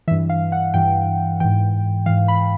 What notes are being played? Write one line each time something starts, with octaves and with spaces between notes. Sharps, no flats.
G2 E3 E5
F5
F#5
G2 E3 G5
G#2 E3 G5
G#2 E3 F5
B5